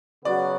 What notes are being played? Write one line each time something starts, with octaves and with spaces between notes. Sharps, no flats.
C#3 F#3 B3 F#4 D5